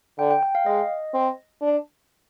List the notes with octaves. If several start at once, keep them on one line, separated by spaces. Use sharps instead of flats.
D3 G5
G5
G5
F5
G#3 D#5
C4
D4